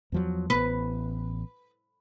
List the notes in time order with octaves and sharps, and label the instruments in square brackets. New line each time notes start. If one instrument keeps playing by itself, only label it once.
[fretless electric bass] E2 F3 F#3
[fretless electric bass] A1 B3 [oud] B4